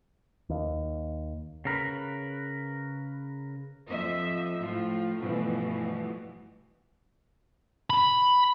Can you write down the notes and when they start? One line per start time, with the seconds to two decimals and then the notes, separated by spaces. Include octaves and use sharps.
0.49 D#2
1.65 C#3 A#4 B4
3.88 F2 F3 D#5 E5
4.60 A2 F3 F4
5.17 G2 B2 E3 F3 A3
7.90 B5